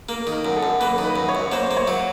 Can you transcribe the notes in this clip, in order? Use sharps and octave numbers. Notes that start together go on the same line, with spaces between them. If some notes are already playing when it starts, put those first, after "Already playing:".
A#3 A#4
D#3
A#4
F#2
A4
F#2
A#3 B4
D#3
B4
F#2
C#5
F#2
A#3 C5
A#3
C#5
F#3